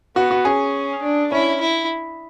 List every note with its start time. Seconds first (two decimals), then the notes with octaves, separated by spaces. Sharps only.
0.16 B3 F#4
0.31 F#4
0.45 C#4 G#4
1.02 D4
1.32 C#4 E4
1.61 E4